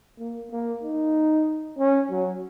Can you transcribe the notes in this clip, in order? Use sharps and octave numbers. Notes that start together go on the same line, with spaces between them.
A#3
A#3
D#4
C#4
F#3